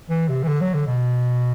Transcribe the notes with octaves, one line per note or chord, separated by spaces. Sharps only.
E3
C3
E3
D3
F#3
D3
B2